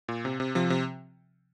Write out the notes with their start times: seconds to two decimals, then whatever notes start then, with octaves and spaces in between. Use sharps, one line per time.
0.08 A#2
0.25 C3
0.40 C3
0.55 C3 F3
0.70 C3